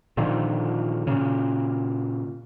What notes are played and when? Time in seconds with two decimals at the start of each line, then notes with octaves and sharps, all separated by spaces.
0.17 A#2 D3 D#3 F3
1.07 A#2 C#3